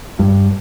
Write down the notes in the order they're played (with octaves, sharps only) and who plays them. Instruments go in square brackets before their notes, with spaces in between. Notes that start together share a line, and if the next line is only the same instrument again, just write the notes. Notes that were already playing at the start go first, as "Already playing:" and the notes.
[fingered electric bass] G2